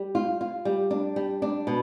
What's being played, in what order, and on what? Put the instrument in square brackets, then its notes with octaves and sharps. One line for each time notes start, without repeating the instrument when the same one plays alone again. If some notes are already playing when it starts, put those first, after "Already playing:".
Already playing: [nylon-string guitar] G3
F4
F4
G3
D4
G3
D4
B2